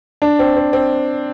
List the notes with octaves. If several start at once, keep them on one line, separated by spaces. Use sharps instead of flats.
D4
C4
C4
C4